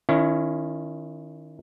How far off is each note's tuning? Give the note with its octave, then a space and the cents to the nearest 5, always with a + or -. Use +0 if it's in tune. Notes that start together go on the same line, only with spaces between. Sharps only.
D#3 +0 C#4 +0 E4 +35